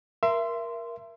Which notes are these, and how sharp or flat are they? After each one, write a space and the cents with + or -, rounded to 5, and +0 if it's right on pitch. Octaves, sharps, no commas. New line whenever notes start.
A#4 +15 E5 +25 C6 -10